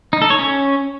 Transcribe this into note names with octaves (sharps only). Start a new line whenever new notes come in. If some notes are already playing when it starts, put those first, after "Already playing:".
D#4
A4
C#5
C#4